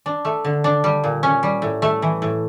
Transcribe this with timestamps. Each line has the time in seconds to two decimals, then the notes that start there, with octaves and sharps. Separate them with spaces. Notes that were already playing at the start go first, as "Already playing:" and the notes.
0.06 D4
0.25 A3
0.44 D3
0.64 D4
0.84 G3
1.04 A#2
1.23 C#4
1.43 G3
1.62 A2
1.82 A3
2.02 E3
2.22 A2